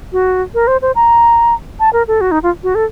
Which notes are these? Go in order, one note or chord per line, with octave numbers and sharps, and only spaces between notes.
F#4
A#4
C5
C5
A#5
A5
A#4
A4
F#4
D#4
F4
F#4
A4